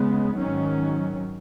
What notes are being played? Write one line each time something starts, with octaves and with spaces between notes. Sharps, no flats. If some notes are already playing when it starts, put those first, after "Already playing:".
Already playing: C#3 G#3 B3
G#2 D#3 F#3 C#4